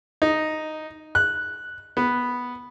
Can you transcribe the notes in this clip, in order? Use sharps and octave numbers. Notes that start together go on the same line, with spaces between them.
D#4
F#6
B3